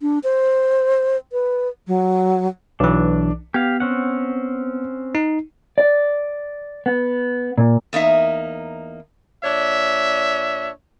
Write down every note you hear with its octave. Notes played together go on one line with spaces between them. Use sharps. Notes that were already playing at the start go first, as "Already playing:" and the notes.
D4
C5
B4
F#3
B1 E3 D4
B3 G4 F5
C4 C#4 F#5
D#4
D5
B3
A#2
E2 A#3 D#4 E5
A#2 D4 C#5 E5